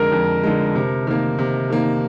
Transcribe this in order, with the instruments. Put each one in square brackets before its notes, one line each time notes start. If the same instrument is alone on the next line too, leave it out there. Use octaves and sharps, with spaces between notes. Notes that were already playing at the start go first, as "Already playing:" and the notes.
Already playing: [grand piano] F2 D3 G#3 [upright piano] A#4
[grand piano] F2
D3 G#3
C3
D#3 A#3
C3
D#3 A#3